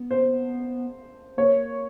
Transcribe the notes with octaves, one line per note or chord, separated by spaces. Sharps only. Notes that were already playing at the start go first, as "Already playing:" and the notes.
Already playing: B3
C5
A#3 C#5